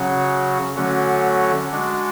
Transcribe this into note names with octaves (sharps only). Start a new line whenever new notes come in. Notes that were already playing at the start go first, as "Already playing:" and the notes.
Already playing: C#3 F#3 C#4 F#4
D3 F#3 A3 C#4 F#4
G#3 D4 F#4